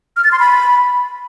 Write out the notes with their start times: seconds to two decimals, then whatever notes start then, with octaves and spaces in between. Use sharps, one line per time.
0.16 F6
0.24 A6
0.32 C6
0.39 B5